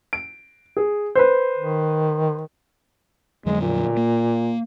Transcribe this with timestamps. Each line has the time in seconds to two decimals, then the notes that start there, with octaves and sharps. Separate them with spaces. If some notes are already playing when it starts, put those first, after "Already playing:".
0.13 D7
0.77 G#4
1.15 B4 C5
1.57 D#3
3.46 F2 D3 F#3 G#3
3.61 A#2
3.97 A#3